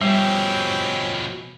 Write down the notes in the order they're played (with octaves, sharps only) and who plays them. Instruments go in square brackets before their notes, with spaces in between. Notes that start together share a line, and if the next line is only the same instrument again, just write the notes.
[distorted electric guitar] B2 F3 [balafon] G3 [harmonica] C4 C#4 G4